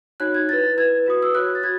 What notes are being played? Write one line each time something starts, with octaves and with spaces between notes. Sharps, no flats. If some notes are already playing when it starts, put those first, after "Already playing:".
D#4 F#4 C#5 F#6
G#6
E4 B4 A6
E4 B4 G#6
F#4 B4 D#6
E6
F#4 C#5 F#6
A6
F#4 G#6